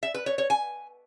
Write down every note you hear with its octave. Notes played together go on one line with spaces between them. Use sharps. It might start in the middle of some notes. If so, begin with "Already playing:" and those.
E5
B4
C#5
C#5
G#5